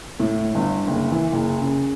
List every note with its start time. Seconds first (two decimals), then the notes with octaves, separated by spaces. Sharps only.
0.20 A2
0.55 G1
0.87 F#1
1.12 E3
1.33 F#1
1.61 C#3